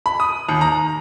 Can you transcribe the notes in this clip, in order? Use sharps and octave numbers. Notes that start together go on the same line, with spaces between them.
B5
D#6
D#2
A#5